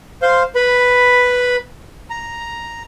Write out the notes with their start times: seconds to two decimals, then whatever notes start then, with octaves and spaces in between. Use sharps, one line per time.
0.22 C5 F5 C6
0.55 B4 B5
2.10 A#5